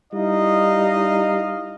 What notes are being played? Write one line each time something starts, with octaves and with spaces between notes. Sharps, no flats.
G3 D#4 E4 D#5 F5